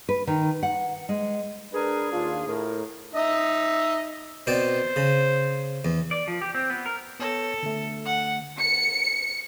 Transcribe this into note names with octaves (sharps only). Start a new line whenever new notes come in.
B4
D#3
F#5
G#3
D4 G#4 A#4 B4
D#2 D4 F4
A2 A#4
D#4 D#5 E5
B2 C4 C5 D5
C#3
E2
D5
F3
G4
C4
B3
A#4
B3 A4 C#5 A#6
D3 A3
F#5
C#7